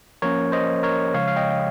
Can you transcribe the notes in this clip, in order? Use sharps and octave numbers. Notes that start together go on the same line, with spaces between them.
F3 A#3 C#4 A#4 C#5
C5 D#5
A#4 C#5
C#3 F3 G#3 C#5 F5
F5
D#5 G5